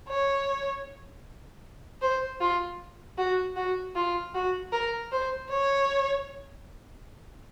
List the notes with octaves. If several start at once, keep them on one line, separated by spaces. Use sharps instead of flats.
C#5
C5
F4
F#4
F#4
F4
F#4
A#4
C5
C#5